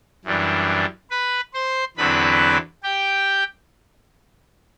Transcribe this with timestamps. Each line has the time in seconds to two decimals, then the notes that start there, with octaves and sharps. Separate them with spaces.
0.25 F#2 E3 G3 D4
1.11 B4 B5
1.54 C5 C6
1.97 E2 D3 F#3 C4 E4 B4 B5
2.83 G4 G5